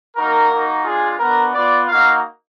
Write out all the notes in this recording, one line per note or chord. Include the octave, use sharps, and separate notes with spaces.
A#3 D#4 F#4 A#4
A#3 D#4 F#4
G#3 D4 F4 G#4
B3 D4 F#4 A#4
B3 F4 D5
A#3 D#4 F#4 F5